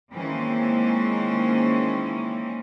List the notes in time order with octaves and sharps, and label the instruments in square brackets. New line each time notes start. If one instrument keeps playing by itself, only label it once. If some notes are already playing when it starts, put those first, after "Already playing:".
[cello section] D#3 E3 G#3 A#3 C4 C#4